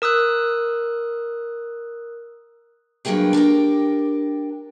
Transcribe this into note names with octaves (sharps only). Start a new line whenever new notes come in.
A#4 D#6 E6 F#6
G2 F#3 A#3 C#4 G#4 G5
D4 G4 A#4 G5